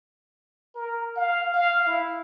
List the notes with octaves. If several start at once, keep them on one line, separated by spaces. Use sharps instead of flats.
A#4
F5
F5
E4